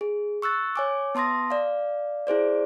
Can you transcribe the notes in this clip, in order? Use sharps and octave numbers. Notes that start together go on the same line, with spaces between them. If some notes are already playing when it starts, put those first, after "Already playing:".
G#4
C#6 E6 F#6 A6
C#5 G#5 D6
B3 A5 C6 D#6 A#6
D5 F5
E4 G#4 C5 D5